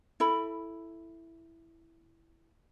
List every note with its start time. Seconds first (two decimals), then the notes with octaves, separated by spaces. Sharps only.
0.20 E4 A4 B5